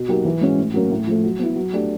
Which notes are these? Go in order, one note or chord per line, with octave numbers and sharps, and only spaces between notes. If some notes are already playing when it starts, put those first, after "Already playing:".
Already playing: B2
F#3 A#3 D#4 G4
E3
G#3 C#4 F#4
A2
F#3 A#3 C#4
A2
F3 A3
F#3
B3 E4
F#3
A3 D4 G4